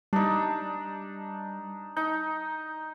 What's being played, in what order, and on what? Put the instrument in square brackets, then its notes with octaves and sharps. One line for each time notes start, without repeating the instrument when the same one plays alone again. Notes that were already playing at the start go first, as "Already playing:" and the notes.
[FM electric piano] G3 [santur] D4 D#4
[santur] D#4 [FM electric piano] G6